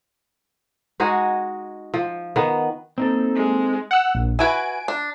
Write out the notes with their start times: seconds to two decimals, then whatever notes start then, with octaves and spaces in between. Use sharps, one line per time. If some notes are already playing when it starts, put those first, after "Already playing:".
1.00 G#3 D#4 F#4 G#4
1.94 F3
2.36 D#3 B3
2.98 A#3 C4 D#4 A4
3.35 G#3
3.91 F#5 E6
4.15 A#1
4.39 E4 F#4 B4 G#5 D7
4.88 D4